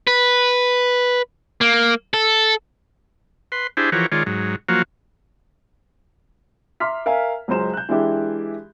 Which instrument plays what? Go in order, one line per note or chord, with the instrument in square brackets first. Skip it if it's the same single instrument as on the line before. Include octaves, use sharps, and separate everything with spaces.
[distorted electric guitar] B4
A#3
A4
[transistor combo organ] B4 C6
D4 E4 G4 G#4 C5
E3 F3 F#4 G4 A#4 C#5
D#3 G#3 F4 C#5 D5
G#2 F#3
F3 F#3 A#3 F#4
[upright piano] E5 A#5 C6 D6 F6 B6
A#4 E5 F5 G#5
C#2 F#3 G#3 C5 E7
F#6 G6
E3 G#3 D4 E4 G4 G#4